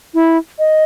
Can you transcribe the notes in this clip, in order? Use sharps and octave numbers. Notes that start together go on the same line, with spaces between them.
E4
D#5